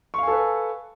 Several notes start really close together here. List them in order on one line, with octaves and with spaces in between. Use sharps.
C#6 F5 G#5 A4 B4